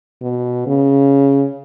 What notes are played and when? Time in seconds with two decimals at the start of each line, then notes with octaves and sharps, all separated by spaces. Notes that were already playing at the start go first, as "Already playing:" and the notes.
0.22 B2
0.67 C#3